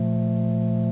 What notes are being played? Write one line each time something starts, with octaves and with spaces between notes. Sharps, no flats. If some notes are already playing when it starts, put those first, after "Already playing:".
Already playing: A#2 F3 A3